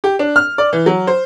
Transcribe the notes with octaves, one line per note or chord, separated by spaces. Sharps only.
G4
D4
F6
D5
E3
F#3
C5